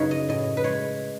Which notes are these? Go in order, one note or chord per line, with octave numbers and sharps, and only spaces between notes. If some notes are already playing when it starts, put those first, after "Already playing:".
Already playing: F#2 C#3 D#4 B4 C#5
D#5
A2 D#5
B4
G#3 C#5